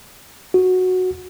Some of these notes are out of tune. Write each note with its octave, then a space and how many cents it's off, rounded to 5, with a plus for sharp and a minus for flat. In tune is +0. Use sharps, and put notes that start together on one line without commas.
F#4 -5